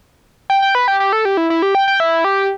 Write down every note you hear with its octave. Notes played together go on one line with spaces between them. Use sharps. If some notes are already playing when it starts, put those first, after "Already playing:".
G5
G5
B4
G4
G4
A4
G4
E4
E4
G4
G5
G5
E4
G4